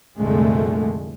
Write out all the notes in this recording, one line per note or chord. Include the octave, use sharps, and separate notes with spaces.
C2 F2 A#2 D3 G#3 A3